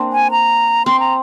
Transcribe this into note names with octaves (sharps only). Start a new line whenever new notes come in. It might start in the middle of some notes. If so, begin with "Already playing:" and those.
Already playing: A#3 C4 D4
G#5
A#5
C4 C6
A#5